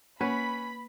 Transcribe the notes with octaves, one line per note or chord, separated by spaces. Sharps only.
A#3 C#4 B4 B5